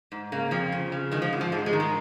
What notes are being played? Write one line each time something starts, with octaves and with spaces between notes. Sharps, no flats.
G#2
C#3 A#3
F2 F3
C#3
C#3
D#3 G#3
F3
G#2
F3
G#2 G#3
G#3
D#3
G#3